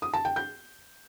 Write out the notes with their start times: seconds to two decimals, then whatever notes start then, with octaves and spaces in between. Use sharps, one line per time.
0.02 D#6
0.14 A5
0.25 G5
0.36 G6